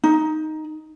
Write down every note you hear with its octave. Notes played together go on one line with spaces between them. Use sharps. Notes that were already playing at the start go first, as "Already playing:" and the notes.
D#4